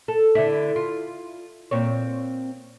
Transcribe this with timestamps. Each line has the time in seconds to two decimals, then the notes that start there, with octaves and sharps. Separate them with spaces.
0.08 A4
0.35 D3 E4
0.76 F4
1.71 A#2 C4 C#5